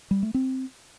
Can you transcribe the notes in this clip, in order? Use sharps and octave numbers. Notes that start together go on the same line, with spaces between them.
G3
A3
C4